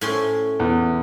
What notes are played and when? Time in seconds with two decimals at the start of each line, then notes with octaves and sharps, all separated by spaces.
0.01 A2 C#4 C6
0.60 E2